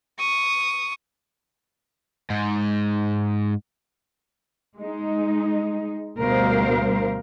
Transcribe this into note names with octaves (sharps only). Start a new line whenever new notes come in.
C#6 D#6
G#2
G#3 D#4
D2 B2 G3 A#4 C5 F5